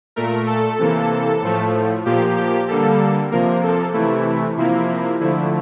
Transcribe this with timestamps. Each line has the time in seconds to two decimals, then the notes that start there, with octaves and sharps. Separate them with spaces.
0.16 A#2 A3 A#4
0.47 A4
0.79 C3 E3 A#3
1.42 A2 F3 A3
2.05 A#2 F3 A#3 G4
2.37 G4
2.68 D3 G3 A#3 A4
3.31 C3 F3 A#3 A#4
3.63 A4
3.94 C3 E3 A3 E4
4.57 C3 F3 A#3 E4
4.89 E4
5.21 D3 F3 A3 E4